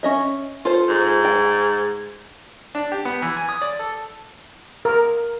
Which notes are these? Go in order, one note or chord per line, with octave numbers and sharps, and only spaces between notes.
C#4 D#5 E5
F4 A4 C5
G#2
G5
D4
G4
B3
E3
G#5
D#6
D5
A4
A#4